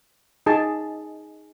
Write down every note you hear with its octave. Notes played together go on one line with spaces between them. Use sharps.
D#4 G#4 A5